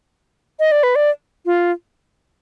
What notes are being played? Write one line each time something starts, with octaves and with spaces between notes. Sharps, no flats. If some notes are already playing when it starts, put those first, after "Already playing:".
D#5
D5
B4
D5
F4